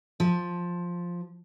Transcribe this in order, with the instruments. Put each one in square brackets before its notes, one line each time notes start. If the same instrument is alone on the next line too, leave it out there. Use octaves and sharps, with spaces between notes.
[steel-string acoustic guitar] F3